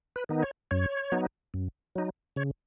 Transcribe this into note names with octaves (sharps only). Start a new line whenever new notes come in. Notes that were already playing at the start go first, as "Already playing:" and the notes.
B4
D#3 B3 D#4
C#5
F#2 C#5
F#3 B3 D#4
F#2
F#3 D#4
C#3 C#5